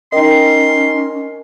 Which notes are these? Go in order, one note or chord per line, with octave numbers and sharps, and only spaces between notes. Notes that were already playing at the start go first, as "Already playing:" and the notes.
C#4 D#4 A#4 D#5 G5 C6